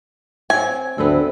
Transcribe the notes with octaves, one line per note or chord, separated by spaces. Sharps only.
C4 C#5 G#5
D2 B3 C4 A4